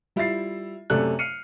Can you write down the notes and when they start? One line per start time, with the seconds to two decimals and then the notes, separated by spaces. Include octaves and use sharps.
0.16 G3 E4 F4 E5 A6 C7
0.90 F#2 C3 A3 A4 D5 F#6
1.19 F6 C7 C#7 D#7